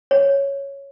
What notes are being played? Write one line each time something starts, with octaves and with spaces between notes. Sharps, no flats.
C#5